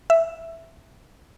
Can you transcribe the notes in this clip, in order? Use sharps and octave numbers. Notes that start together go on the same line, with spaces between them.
E5